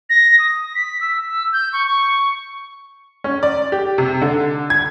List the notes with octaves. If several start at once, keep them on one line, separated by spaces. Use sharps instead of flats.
A#6
D#6
B6
E6
E6
G6
C#6
C#6
C#4
D5
G4
C3
D3
G#6